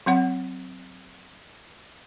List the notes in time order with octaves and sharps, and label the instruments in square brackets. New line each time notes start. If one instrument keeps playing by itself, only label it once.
[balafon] F#3 C4 F#5